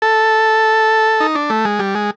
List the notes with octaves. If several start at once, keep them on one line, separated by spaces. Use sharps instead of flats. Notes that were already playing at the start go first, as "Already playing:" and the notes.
A4
D#4
D4
A3
G#3
G3
G#3